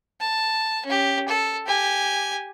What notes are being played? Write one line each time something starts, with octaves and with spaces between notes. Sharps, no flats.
A5
C#4 G4
A4
G4 G#5